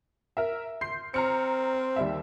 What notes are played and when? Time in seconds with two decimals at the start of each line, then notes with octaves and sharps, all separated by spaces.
0.37 A#4 E5
0.81 C6 G6 C7
1.14 C4 A#5 F6 C#7
1.96 D#2 G3 E5